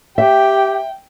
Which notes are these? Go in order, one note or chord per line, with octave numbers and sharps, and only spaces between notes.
G4 E5 G5